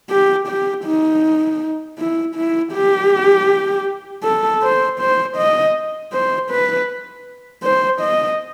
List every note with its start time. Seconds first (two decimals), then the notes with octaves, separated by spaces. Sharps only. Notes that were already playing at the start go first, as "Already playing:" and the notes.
0.10 G4
0.48 G4
0.85 D#4
1.99 E4
2.36 E4
2.73 G4
4.24 A4
4.63 C5
5.00 C5
5.38 D#5
6.13 C5
6.51 B4
7.63 C5
8.02 D#5